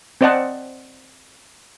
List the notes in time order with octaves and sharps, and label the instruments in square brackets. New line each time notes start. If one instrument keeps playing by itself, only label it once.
[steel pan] C4 C5 D5 D#5 F#5 A5